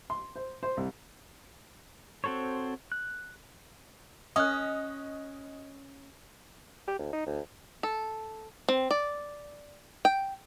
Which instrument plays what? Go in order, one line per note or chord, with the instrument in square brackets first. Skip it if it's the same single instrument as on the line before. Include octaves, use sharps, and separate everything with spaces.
[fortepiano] C6
C5
C5
C2
[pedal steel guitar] C4 F#4 A4 C5 C#5
F#6
[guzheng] C#4 [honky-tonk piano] D#5 [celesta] D#6 F#6
[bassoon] G4
D2
D#4
D2
[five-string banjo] A4
C4
D5
G5